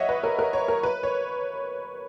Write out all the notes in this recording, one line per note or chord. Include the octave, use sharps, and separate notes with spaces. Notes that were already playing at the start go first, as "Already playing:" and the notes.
Already playing: C#5 D#5 E5 F#5
B4
A#4
A#4
C#5
A#4
B4
C#5